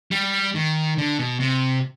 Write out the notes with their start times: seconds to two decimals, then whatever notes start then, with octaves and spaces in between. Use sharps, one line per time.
0.11 G3
0.55 D#3
0.98 D3
1.19 B2
1.40 C3